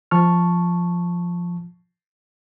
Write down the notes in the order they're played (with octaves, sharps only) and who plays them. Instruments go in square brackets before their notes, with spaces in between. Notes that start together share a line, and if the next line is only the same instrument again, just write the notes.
[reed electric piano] F3 A5 C#6 F6